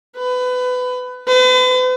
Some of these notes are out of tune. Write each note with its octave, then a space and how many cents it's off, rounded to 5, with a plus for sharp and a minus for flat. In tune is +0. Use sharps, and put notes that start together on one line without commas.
B4 +25
B4 +45